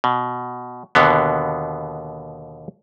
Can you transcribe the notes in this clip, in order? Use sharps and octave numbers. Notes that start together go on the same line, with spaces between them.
B2
D#2 B2 D3 B3